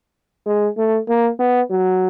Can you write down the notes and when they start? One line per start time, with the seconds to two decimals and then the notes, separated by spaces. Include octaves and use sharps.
0.46 G#3
0.77 A3
1.08 A#3
1.39 B3
1.70 F#3